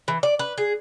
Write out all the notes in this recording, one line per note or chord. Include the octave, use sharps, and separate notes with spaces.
E3
D5
B4
G#4